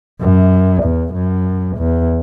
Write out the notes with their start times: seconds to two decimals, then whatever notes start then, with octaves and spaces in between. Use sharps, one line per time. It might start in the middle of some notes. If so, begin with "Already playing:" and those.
0.21 F#2
0.83 E2
1.14 F#2
1.77 E2